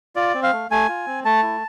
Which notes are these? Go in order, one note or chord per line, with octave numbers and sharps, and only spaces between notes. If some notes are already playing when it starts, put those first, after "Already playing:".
F4 D5
C4
F5
A3
A3 G#5
F4
C4
A3 A5
E4